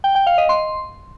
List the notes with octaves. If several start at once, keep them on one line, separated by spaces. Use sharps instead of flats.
G5
G5
F5
D#5
C6